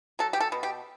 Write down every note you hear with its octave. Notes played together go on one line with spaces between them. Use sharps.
F#3 A4
G4
A4
B2
G4